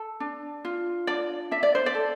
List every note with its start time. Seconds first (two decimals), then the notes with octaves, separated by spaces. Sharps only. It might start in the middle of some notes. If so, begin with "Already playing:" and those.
Already playing: A4
0.20 D4
0.65 F4
1.07 D4 D5
1.51 D4 E5
1.63 D5
1.75 C5
1.86 D5
1.95 A4